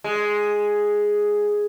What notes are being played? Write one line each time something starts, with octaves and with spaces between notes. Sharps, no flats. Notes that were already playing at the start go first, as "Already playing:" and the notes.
G#3